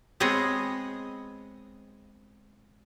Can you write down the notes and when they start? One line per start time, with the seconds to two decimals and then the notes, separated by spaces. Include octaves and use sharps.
0.20 G#3 B3 C4 G#4 C#5 D#5